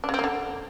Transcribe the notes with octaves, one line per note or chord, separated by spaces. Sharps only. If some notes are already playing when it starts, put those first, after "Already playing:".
D4
C#3
C4
A#3
D3